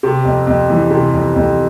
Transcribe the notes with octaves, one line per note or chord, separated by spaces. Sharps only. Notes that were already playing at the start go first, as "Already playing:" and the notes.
C3
F2
F2
E3
C3
F2
F2